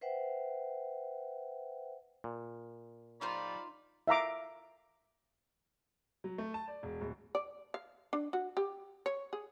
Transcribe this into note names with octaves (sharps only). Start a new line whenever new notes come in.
B4 C5 E5 F#5 G5
A#2
D#4 F4 C5 D5 B5
E5 F5 A#5 D6
F#3
A3
A5
D5
E1
D1
D5
F5
D4
F#4
G4
C#5
G#4